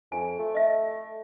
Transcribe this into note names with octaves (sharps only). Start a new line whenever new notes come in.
F2 G#5
A3
D#5 E5